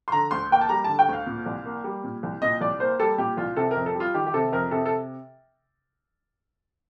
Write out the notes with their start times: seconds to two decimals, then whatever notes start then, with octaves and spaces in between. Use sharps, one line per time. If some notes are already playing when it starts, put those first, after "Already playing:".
0.08 C6
0.12 D3 A#5
0.31 D2 C6
0.51 A#3 G5
0.61 A5
0.69 G3 A#5
0.84 D3 A5
0.99 G5
1.08 D2 F5
1.26 A#2
1.46 C2
1.65 A#3
1.84 G3
2.04 A#2
2.23 C2
2.42 A#2 D#5
2.61 C2 D5
2.80 A#3 C5
2.99 G3 A4
3.18 A#2 G4
3.37 C2 F4
3.56 C3 A4
3.71 F2 A#4
3.86 A4
3.95 G3
4.00 F4
4.14 D#3 G4
4.27 G4
4.34 C3 A4
4.52 F2 A#4
4.71 C3 A4
4.86 A4